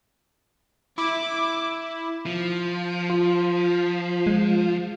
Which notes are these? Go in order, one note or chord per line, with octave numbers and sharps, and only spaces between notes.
E4 D6
F3
F4
G#3